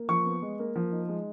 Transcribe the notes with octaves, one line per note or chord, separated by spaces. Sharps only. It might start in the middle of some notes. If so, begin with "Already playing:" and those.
Already playing: A#3
F3 C#6
B3
G#3
A#3
F3
D#4
G#3